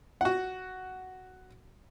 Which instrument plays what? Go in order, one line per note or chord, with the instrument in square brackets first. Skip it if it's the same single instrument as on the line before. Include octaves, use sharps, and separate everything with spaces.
[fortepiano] F#4 F#5